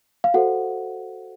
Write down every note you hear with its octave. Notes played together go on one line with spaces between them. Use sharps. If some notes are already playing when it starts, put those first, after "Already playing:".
F5
F#4 A4 C5 F#5